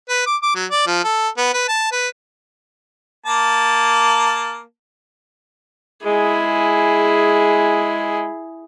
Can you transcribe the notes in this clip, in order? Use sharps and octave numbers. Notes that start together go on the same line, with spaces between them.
B4
D6
D6
F#3
D5
F3
A4
B3
B4
A5
B4
A#3 A5
G#3 E4 G#4